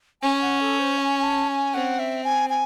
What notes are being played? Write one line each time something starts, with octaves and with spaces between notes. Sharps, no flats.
C#4 G#5
F#5
A4
C5
G#5
G#5
A5
G#5
C4 F#5
E5
G#5
G#5